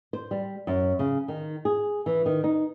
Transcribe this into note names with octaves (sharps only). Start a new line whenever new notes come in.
C5
G3
F#2
C#3
D#3
G#4
E3
D#3
D#4